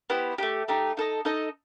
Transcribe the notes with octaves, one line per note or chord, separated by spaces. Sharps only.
B3 E4 G4 C5
A3 D#4 G4
A3 D#4 G4
D#4 A4 D#5
D#4 A4 D#5